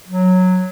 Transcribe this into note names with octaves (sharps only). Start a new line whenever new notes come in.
F#3